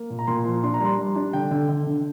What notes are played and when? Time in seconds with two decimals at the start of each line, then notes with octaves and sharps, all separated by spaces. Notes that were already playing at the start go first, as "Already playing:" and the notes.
Already playing: A#3
0.10 A#2
0.19 A#5
0.27 A#2 C6
0.45 F3
0.63 D4 C6
0.74 A#5
0.81 G3 C6
0.99 G3
1.16 D4
1.33 D3 G5
1.51 D3
1.69 D3
1.87 D3